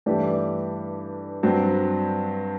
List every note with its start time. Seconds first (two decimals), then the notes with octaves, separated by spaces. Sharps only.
0.06 G2 E3 A3 D4 G4
1.43 G2 F#3 C4